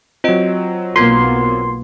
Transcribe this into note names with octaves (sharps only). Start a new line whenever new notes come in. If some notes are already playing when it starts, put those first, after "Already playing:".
F#3 C4 F4 D#5 D7
B1 A#3 B3 F4 C6 G#6